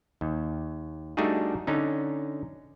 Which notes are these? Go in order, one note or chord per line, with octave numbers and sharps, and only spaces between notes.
D#2
G3 A3 D4 D#4 F#4 G#4
D3 C#4 D#4